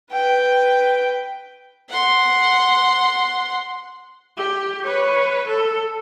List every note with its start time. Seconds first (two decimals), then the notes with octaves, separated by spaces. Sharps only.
0.12 B4 G5
1.89 F#5 C6
4.37 G4
4.84 B4 C#5
5.48 A4